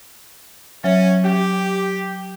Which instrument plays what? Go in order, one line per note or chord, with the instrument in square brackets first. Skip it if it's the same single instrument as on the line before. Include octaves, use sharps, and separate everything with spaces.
[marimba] F#3 E5 [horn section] C#4
[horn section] G4